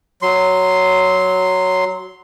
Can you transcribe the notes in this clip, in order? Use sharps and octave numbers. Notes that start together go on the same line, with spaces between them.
F#3 C6